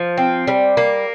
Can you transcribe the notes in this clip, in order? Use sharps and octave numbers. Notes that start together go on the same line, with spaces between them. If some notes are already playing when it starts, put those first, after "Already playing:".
Already playing: F3
C4
G3
A#3